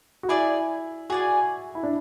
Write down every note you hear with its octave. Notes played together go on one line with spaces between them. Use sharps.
F#4
E4 G#4 D5 G#5
F#4 G#4 D5 G#5
E4
D4